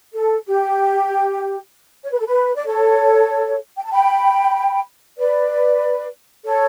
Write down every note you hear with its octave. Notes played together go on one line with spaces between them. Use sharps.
A4
G4
C#5
B4
A4
B4
D5
A4 C#5
G5
A5
G5 B5
B4 D5
A4 C#5